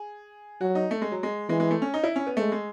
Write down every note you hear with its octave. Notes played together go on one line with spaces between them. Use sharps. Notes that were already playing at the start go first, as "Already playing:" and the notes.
Already playing: G#4
F#3 F#4
D#4
A3
G#3
F#3
G#3
E3 G#3
G#3
A3
C#4
D#4
E4
C#4
B3
G#3 A3
G#3